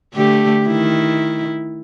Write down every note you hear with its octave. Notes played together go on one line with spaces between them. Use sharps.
D3 A3 G4
D#3 E4